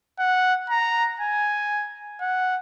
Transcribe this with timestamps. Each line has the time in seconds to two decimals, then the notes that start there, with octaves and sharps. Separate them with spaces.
0.19 F#5
0.70 A#5
1.20 G#5
2.21 F#5